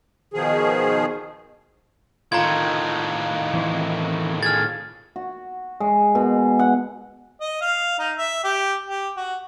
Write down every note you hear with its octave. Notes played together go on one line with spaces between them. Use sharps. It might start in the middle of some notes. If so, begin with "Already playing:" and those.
B2 D#3 F3 G#4
A2 D#3 F4 A#5 G#6
E3 C4 E4
G#4 F6 G#6 A6
F#4
G#3
B2
F#5
D#5
F5
D#4
E5
G4
G4
F#4